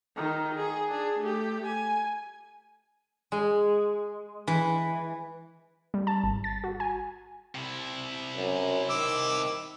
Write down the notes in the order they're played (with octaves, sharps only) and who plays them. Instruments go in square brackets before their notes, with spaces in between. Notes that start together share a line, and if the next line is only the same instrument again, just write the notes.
[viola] D#3 D#4
G#4
D4 G#4
A3 G4
G#5
[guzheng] G#3
E3
[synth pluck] G3
A5
G#1
A6
F#4
G#5
[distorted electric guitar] C3 E4
[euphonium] F#2
[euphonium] D#3 [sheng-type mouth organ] D6 E6